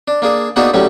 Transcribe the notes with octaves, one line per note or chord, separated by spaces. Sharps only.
D4
A#3 D4 G#4
A#3 B3 D4 D#4 F#4 G#4
A2 F#3 G3 C#4